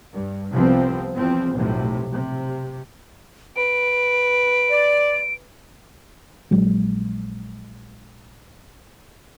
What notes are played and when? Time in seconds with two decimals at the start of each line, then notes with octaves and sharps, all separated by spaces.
0.13 G2
0.52 C2 C3 F3 B3 C4
1.16 E2 F3 C4
1.54 F1 B1 A2 C3
2.12 C3
3.56 B4 D7
4.70 D5
6.51 A#1 F#3 G#3